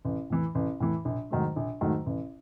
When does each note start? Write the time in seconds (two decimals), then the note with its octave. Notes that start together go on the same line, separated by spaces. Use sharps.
0.05 A1
0.30 A2 E3
0.55 A1
0.80 A2 E3
1.05 A#1
1.31 G#2 D#3 F#3 A3
1.56 A#1
1.81 G#2 D#3 F#3 A3
2.06 A1